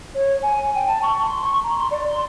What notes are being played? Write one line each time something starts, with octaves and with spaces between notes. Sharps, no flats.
C#5
G#5
G5
A5
C#6
C6
C#6
A#5
C6
D5
C6